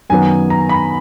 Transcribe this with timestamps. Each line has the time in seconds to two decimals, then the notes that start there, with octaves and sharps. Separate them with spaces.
0.10 F#2 D#3 F#3 B3 G#5
0.50 A#5
0.69 B5